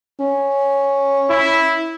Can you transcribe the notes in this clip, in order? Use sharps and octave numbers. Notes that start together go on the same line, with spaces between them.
C#4
E4